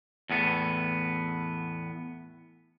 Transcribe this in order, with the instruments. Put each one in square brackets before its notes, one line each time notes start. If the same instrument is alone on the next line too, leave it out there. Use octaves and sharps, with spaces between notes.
[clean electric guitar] E2 A2 B3